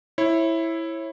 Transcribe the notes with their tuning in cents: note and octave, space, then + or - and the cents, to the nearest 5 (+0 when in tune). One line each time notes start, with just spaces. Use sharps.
E4 +0 C#5 -30